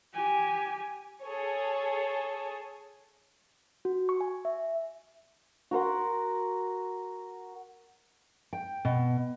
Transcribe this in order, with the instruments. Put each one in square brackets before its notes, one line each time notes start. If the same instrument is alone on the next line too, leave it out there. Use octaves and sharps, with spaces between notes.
[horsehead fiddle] G4 G#5
[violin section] G#4 A4 C#5
[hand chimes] F#4
C#6
G#5
E5
[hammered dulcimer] F#4 A#4 F#5 C6
[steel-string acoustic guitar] G5
B2